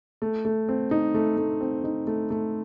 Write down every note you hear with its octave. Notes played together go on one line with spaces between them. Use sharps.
A3
A3
C4
D#4
A3
A3
C4
D#4
A3
A3